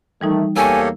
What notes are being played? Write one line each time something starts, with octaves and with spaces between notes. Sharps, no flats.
D#3 E3 G3 A3 D#4
E2 A#3 G4 A4 C#5 G#5 C#6 E6